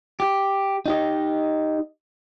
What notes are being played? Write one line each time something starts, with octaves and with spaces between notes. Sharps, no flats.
G4
D#4 G4 D#5